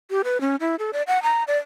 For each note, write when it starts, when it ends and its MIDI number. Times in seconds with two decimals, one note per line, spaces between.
0.11 0.22 67
0.24 0.40 71
0.41 0.56 61
0.60 0.76 64
0.79 0.91 69
0.93 1.02 74
1.07 1.22 78
1.23 1.44 82
1.48 1.57 74